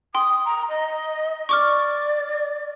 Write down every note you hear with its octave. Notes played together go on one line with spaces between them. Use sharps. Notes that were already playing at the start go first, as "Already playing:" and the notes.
G5 C6 D#6
A#5
D#5
D5 C#6 D6 F6